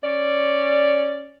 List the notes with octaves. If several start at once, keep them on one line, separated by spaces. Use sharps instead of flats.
C#4 D5